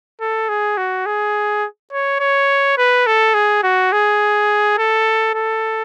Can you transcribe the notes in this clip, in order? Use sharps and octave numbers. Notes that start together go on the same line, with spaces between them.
A4
G#4
F#4
G#4
C#5
C#5
B4
A4
G#4
F#4
G#4
A4
A4